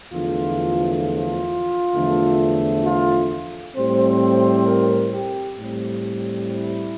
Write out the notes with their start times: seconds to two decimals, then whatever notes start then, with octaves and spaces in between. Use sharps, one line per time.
0.11 E2 D3 F3 A3 F4
1.02 F4
1.94 E2 D3 F3 A3
2.84 F4
3.75 A2 G3 C4 C5
4.21 C5
4.66 A#4
5.12 G4
5.57 A2 G3 C4
6.48 E4